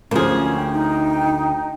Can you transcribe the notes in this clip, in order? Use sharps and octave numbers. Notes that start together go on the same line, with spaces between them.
D2 F3 A#3 C#4 G#4
G5
D#4